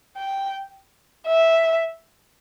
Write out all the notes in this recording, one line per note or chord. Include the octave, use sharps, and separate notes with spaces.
G5
E5